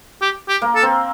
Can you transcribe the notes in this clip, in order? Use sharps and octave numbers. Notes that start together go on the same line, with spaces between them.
G4
G4
A#3
A4
C4